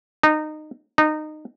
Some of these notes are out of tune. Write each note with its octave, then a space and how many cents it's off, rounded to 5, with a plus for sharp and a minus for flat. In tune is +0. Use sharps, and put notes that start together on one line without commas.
D#4 -20
D#4 -20